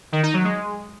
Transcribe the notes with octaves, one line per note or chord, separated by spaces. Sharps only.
D#3
D#4
F#3
G#3